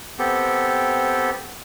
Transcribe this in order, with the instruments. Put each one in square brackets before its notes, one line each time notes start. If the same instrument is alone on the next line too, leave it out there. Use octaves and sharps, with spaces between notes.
[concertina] B3 C4 G4 A4